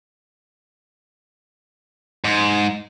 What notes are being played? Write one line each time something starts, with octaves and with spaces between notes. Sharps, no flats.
G#2